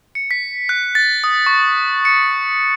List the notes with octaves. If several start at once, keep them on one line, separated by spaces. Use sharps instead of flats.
C#7
B6
F#6
A6
D#6
C#6
C#7